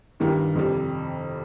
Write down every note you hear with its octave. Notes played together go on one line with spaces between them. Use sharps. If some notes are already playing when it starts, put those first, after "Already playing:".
G2 D#3 G3
F2 C3 G3